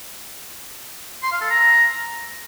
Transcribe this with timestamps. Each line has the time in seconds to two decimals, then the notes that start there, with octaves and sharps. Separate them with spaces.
1.23 C6
1.32 F5
1.41 A4
1.50 A#5